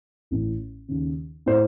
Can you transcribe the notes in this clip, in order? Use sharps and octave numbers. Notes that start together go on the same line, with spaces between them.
A1 A2
D#2 C#3
A2 C5